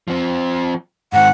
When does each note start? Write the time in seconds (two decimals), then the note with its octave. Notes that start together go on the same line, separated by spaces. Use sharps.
0.08 F3 C4
1.13 G#2 D#3 F#5